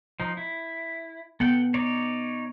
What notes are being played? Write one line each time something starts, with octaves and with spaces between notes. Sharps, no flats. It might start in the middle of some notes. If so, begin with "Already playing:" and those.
F3 D#4
E4
B3 A4 F#5 G5
D#4 C#5 D5